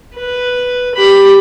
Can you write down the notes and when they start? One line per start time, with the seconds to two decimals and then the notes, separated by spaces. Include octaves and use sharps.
0.15 B4
0.95 G4 B5